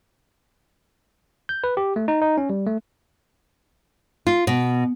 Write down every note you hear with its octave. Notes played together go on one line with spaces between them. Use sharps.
G6
B4
G4
A3
D#4
D#4
C#4
G3
A3
F4
B2